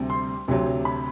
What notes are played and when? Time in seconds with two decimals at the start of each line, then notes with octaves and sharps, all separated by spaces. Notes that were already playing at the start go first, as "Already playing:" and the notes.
Already playing: D2 C3 G3 C4
0.10 C6
0.48 D2 C3 F#3
0.85 B5